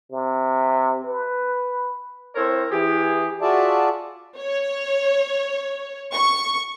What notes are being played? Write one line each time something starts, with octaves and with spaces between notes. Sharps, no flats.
C3
B4
C4 E4 A4 A#4 C5 C#5
E3 G4 G#4
F4 F#4 G#4 D5 E5 A5
C#5
C#6